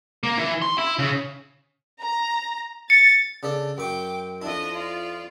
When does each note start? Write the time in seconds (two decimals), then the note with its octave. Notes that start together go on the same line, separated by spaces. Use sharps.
0.23 A#3
0.38 E3
0.62 C6
0.78 E4
0.99 C#3
2.02 A#5
2.90 A6 C#7
3.43 C#3 D4 A4
3.78 F#2 G5 C#6 D6
4.42 F2 D4 E4 D#5
4.72 F4 D5